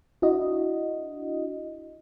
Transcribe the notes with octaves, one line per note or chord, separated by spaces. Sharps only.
D4 E4 F#4 D#5